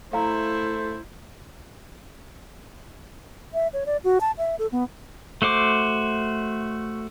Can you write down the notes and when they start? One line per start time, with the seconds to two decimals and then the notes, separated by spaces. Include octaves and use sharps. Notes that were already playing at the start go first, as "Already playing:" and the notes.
0.13 A3 E4 C5 F5 A#5
3.54 E5
3.73 C#5
3.86 D5
4.04 F#4
4.21 A5
4.38 E5
4.59 A4
4.72 B3
5.42 A3 F#4 C5 D6